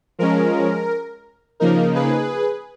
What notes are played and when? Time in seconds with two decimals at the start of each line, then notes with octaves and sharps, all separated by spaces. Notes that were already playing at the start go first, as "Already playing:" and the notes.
0.19 F3 G#3 C#4 A#4
1.60 C#3 F3 A#3 D#4 A#4
1.95 G#4 B4